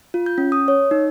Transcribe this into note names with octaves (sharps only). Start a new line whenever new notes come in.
F4
G6
C#4
D#6
C#5
D#4